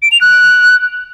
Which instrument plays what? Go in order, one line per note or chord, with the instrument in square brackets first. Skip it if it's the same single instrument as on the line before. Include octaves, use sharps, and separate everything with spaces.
[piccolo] D7
F7
F#6